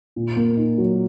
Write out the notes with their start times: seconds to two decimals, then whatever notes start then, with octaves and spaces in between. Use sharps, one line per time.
0.16 A#2
0.36 A#3
0.57 D#4
0.78 F#3